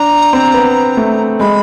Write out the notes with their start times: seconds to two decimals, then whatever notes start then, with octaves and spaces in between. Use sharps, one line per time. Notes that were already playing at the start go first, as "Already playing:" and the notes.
Already playing: D4 A#5
0.33 C4
0.54 B3
0.97 A3
1.40 G#3 B5